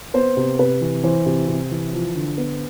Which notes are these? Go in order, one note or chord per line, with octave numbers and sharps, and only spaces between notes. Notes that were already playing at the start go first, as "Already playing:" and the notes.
B3 C5
C3
C3 B4
E3
E3 C5
C3
C3
E3
F3
D3
B3